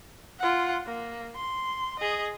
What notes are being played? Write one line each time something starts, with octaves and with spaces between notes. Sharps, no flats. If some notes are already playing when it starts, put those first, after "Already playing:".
F4 F#5
A#3
C6
G#4 D#5